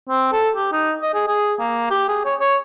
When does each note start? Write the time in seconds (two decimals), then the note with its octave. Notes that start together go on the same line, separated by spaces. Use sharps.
0.09 C4
0.32 A4
0.55 G4
0.72 D#4
1.02 D#5
1.14 G#4
1.28 G#4
1.59 A#3
1.91 G4
2.09 G#4
2.25 C#5
2.40 C#5